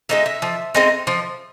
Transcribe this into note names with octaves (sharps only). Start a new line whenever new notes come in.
G#3 C4 D#4 E5
E5
F3
G#3 C4 D#4
F3